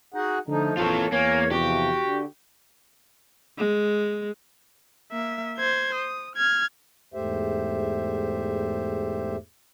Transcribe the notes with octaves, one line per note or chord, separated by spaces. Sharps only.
D#4 F#4 G#4 F#5
D3 F3 A3 D#4
A#1 E3 A#3 F4 A4 C#5
E2 A#3 C#5 G#5
C3 F3 F#4 G4
D3
G#3
A#3 E5
C5 G#6
D#6
F6 G#6
E2 G#2 A3 G4 C5 E5